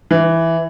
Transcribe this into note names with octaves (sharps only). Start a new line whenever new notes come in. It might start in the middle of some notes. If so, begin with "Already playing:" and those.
E3